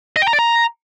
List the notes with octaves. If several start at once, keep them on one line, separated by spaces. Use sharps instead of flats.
D#5
G5
A#5
D5
A#5